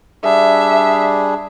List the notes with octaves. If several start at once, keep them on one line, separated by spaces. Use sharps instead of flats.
G3 D4 G#4 E5